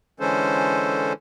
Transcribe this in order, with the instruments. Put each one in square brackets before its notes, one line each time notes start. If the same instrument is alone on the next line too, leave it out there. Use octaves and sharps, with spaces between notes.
[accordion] D3 E3 G#3 C#4 A4 C5